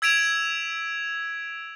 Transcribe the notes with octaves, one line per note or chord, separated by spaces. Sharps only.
E6 G#6 B6 D7 E7 F7